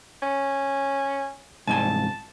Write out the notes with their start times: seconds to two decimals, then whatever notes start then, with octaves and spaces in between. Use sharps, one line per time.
0.22 C#4
1.67 C2 G#2 G#5 A5